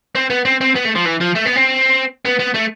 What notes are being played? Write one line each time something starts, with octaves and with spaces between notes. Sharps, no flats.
C4
B3
C4
C4
B3
A3
F3
E3
F3
A3
B3
C4
B3
B3
A3